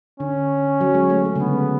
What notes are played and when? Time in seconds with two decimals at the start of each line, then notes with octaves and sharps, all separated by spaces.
0.20 D3 C#4
0.81 F#3
0.95 G#3
1.10 A3
1.25 G#3
1.36 C#3
1.40 D3 B3